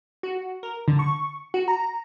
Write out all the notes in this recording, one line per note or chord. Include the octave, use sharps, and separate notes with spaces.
F#4
A#4
D3
C#6
F#4
A#5